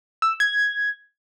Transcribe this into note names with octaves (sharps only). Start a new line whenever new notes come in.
E6
G#6